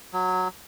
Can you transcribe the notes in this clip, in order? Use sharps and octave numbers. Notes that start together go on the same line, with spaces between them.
F#3